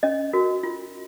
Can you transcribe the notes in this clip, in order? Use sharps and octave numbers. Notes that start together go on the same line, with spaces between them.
C#4 D#5
F#4 A#4
F4